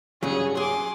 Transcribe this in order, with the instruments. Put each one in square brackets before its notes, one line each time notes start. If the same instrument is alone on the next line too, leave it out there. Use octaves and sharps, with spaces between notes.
[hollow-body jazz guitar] G2 C#3 F#3 [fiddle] C#4 G#4
[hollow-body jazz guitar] F#3 G#4 [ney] G#5 [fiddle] C6 D6